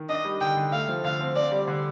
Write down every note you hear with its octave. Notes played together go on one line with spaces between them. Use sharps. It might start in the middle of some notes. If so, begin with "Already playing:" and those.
Already playing: D#3
D4 D#5
G3
D3 G5
D3
A3 F5
F3
D3 F5
C4
C4 D5
G3
D3